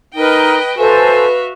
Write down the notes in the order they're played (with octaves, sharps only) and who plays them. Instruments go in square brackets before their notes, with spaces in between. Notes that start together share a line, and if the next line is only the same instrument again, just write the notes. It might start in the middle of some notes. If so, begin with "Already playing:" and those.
[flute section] D#4 A#4 [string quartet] B4 D#5 G5
[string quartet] F#4 E5 F5 [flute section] A4 C5 G#5 [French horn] B4